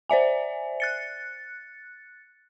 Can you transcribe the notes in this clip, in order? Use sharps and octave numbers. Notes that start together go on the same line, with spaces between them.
C5 D5 E5 G#5
F#6 A6 C#7